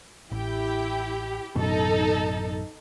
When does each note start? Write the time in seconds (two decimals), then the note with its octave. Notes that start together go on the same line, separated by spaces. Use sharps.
0.32 A1 E4 G4 G5
1.56 A1 F#2 B2 D#4 A4